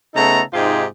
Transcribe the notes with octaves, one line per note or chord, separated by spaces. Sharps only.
C#3 A3 B3 D#4 A4 A#5
G#2 C3 D#4 F4 G4 G#4